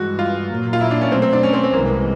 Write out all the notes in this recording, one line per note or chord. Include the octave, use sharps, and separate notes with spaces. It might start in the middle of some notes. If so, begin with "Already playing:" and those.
Already playing: G2 E3 G#3 F#4
F4
A#2 F#3 A#3
F4
E4
D4
C#4
B2 F#3 A3 C4
C4
D4
C#4
C4
C4
C2 C3 E3 G#3 A#3